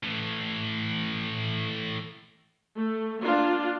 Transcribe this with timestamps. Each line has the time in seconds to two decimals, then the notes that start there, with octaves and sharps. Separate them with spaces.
0.04 A2 E3
2.77 A3
3.22 A#3 D4 F4